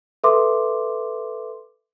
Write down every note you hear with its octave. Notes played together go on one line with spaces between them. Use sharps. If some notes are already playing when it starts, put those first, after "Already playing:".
A4 B4 E5 C6 D6